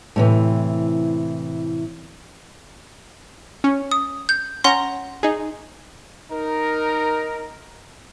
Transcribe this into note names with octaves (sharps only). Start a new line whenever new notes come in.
A2 C3 E3
C#4
D#6
G6
C#4 F#5 A#5 C6 A#6
D#4 G#4
D#4 A#4